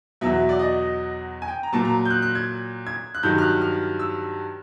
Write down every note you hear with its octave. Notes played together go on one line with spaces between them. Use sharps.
E2 B2 F#3 E5
D5
D#5
G#5
G5
A#5
A#2 F#3 A5
A#5
G6
F#6
F#6
G#6
G#6
F#6
G2 D#3 F#3 G6
F6
F#6
F6
E6